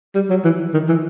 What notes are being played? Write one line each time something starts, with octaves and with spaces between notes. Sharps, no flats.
G3
F#3
E3
D#3
E3